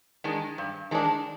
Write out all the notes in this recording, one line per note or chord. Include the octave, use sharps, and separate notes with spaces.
D#3 G#3 D4
G2
D#3 G#3 D4